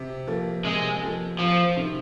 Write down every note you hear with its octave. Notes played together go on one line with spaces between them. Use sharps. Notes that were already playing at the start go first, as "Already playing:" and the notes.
Already playing: C3
F3 A#3
C3 G#3
F3 A#3
F2 F3
C3 D#3